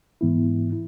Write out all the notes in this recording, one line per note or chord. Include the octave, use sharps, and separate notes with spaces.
G#2 E3 B3 E4
E4